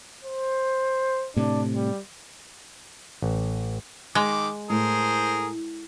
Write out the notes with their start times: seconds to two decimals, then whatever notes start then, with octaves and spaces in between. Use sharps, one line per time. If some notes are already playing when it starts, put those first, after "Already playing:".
0.24 C5
1.37 A2 C3 D4
1.75 G3
3.22 A1
4.15 D#3 G#3 D6
4.70 A2 G#4 A#4 C5